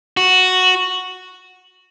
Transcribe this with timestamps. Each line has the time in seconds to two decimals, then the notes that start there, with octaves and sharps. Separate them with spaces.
0.17 F#4